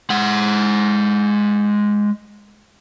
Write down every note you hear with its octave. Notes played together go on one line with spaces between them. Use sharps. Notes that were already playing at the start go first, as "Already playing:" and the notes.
G#3 F#5